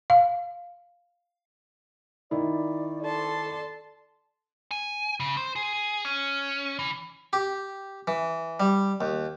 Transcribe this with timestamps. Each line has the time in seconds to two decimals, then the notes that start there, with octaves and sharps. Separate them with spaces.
0.10 F5
2.31 D#3 E4 D5
3.03 A4 D5 A5 C6
4.71 G#5
5.20 C#3
5.37 C5
5.56 G#4
6.05 C#4
6.79 E3
7.33 G4
8.07 E3
8.60 G3
9.01 D#2